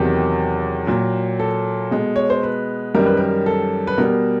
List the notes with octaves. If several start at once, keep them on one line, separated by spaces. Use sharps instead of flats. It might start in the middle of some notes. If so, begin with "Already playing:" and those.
Already playing: E2 C3 D#3 F#3 G4
A#2 F#3
A4
B2 G#3
C#5
C5
B4
F#2 D#3 G3 A#4
B4
A#4
A4
B4
B2 G3 A#4